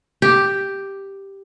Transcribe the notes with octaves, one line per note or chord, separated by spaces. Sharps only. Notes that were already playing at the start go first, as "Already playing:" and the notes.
G4